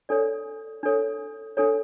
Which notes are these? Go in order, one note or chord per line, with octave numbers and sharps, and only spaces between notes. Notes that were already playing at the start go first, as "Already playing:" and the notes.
D4 A4 C#5 D5
D4 A4 C#5
D4 A4 C#5